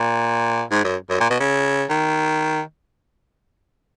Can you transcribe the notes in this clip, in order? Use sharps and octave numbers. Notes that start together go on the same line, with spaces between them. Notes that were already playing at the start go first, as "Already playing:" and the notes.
Already playing: A#2
G#2
F#2
F#2
A#2
B2
C#3
D#3